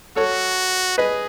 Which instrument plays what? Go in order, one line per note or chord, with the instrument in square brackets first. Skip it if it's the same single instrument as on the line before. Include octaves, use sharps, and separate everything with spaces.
[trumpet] F#4 [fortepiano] A4 C#5
[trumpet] G#4 [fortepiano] B4 D#5